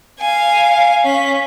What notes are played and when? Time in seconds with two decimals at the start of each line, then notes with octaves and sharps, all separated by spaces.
0.19 F5 G#5
1.04 C#4 B6